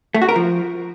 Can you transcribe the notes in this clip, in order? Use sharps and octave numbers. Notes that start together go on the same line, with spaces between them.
A3
F#4
A#4
F3